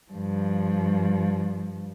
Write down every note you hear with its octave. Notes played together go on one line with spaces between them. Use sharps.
G2 F3